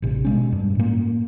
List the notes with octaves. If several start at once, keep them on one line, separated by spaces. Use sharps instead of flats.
A1 C3
B2 G#3 C#4
G2
A2 A#3